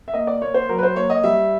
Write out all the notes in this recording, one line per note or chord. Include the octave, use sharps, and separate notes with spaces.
E5
A#3 D#5
D5
A#3 C#5
C5
F#3 A#4
B4
C5
A#3 C#5
D#5
G3 E5